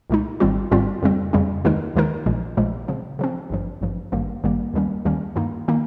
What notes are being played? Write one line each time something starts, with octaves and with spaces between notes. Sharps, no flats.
C2 A#2 G#3 D#4
G#1 G#2 G3 C4 F4
G#1 G#2 G3 C4 F4
F2 C#3 G3 C4
F2 C#3 G3 C4
D#2 D#3 G#3 D#4 A#4
D#2 D#3 G#3 D#4 A#4
A#1 A#2 F3 G#3
A#1 A#2 F3 G#3
C#3 F3 C4
C#3 F3 C4
G#1 G2 F3
G#1 G2 F3
G#1 G2 D#3 G3 A#3
G#1 G2 D#3 G3 A#3
D#2 D#3 G3 A#3 C#4
D#2 D#3 G3 A#3 C#4
G2 D#3 A#3 D#4
D#3 A#3 D#4